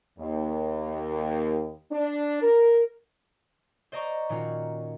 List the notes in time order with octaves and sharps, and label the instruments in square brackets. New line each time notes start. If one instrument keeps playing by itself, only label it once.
[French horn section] D#2
D4
A#4
[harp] C5 D5 D#5 A#5 C#6
A#2 D#3 C#4 F4 F#4